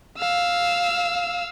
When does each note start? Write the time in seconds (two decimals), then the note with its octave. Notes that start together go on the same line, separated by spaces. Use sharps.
0.19 F5 E6